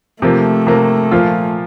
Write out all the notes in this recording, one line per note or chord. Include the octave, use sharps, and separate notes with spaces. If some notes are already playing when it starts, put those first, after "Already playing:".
C3 F3 A3 A#3
C3 F3 A#3
A#2 F3 A#3 F4